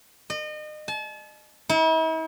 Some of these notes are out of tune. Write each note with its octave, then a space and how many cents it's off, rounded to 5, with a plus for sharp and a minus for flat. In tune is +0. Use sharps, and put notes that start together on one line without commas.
D#5 -35
A5 -40
E4 -45